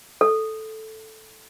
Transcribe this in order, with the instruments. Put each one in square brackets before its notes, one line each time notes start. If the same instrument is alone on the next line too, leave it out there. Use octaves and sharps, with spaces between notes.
[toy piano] A4